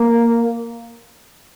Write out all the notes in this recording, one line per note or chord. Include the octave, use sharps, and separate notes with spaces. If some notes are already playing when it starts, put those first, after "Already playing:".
Already playing: A#3